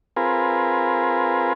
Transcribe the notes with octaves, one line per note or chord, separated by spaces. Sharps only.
C4 F4 G#4 A#4 B4